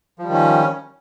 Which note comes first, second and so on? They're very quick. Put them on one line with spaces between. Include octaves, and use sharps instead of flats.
F3 G3 D#3 C#4